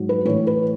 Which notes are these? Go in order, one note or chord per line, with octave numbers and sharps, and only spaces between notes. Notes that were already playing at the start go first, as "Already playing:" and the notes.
Already playing: G#2 F#3
B4
A2 E3 C#5
B4